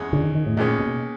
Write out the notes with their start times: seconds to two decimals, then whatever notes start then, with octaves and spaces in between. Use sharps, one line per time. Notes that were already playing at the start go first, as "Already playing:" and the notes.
Already playing: E2 G#3 C#4
0.13 D3
0.24 D#3
0.35 D#3
0.46 A2
0.57 D#2 A#2 D#3 G#3 C#4
0.79 B2